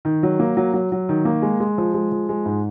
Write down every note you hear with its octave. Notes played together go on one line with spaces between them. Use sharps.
D#3
F#3
A#3
F#3
F#3
F#3
D#3
A#3
G#3
G#3
F3
G#3
F3
G#3
G#2